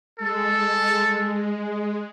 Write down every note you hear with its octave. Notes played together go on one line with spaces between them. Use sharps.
G#3 A4